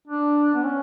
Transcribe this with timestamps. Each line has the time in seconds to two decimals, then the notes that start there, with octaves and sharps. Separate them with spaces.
0.08 D4
0.55 B3
0.65 C#4